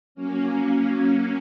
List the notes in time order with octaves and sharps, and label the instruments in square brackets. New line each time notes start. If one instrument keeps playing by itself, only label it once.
[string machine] F#3 A#3 C#4